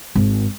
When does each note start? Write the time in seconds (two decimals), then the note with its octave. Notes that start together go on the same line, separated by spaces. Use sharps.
0.15 G#1